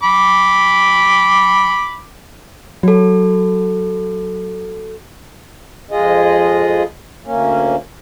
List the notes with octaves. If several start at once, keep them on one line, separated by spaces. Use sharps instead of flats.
B5 D6
F#3 F#4 A4
F2 G#3 F4 G#4 D#5
D2 A#3 C#4